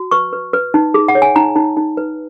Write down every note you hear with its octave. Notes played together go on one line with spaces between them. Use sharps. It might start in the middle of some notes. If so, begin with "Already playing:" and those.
Already playing: F#4
B4 C#6
B4
B4
D#4
G#4
F#5
C#5
G#5
D#4 A#5
D#4
D#4
B4